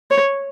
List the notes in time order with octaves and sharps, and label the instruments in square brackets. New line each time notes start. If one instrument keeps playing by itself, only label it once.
[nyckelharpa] C#5